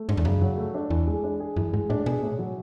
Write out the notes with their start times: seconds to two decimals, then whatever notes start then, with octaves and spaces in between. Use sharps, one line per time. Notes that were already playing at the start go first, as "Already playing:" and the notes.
Already playing: A3
0.08 G#2 D4
0.17 E2
0.25 F#2 C#3
0.42 F#3
0.58 A3
0.74 D4
0.90 E2 E3
1.07 G#3
1.24 D4
1.40 G#4
1.56 F#2 E3
1.73 G#2 G#3
1.90 A2 D4
2.06 B2 G#4
2.22 A2
2.39 F#3